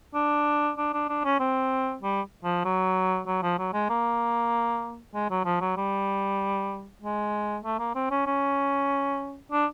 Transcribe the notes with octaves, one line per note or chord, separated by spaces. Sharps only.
D4
D4
D4
D4
C#4
C4
G3
F3
F#3
F#3
F3
F#3
G#3
A#3
G#3
F#3
F3
F#3
G3
G#3
A3
A#3
C4
C#4
C#4
D4